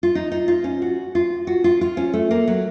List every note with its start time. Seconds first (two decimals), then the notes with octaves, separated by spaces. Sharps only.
0.03 F4
0.15 D#4
0.32 D#4
0.48 F4
0.64 C#4
0.82 F#4
1.15 F4
1.47 F#4
1.64 F4
1.81 F4
1.97 C#4
2.13 A3
2.31 A#3
2.47 F#3